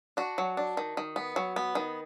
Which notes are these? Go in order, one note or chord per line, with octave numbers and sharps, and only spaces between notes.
D4 F#4
F#3
D4
D#3
D#3
B3
F#3
B3
D#3